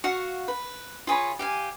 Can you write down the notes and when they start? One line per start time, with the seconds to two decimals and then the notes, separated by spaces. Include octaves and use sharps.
0.04 F#4 F5 F#5 C#6
0.48 B4
1.07 F4 G#4 C#5 B5
1.39 G4 F5 G#5